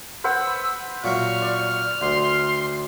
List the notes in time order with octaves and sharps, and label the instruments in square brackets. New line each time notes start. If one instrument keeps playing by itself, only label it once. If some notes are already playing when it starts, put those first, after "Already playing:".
[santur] B4 C5 F#5 [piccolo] E6
[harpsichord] A#2 F#3 E5 [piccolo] C#6 [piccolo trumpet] F6
[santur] D5
[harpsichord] D2 [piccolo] C6